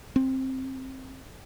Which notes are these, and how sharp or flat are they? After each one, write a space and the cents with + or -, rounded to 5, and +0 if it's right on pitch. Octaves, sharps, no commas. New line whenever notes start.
C4 +10